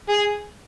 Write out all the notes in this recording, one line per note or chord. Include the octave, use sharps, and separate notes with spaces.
G#4